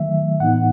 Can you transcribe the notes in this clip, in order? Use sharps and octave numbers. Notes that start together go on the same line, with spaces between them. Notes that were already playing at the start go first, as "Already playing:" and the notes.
Already playing: D#3 F#3 A3 E5
A2 E3 B3 D#4 F#5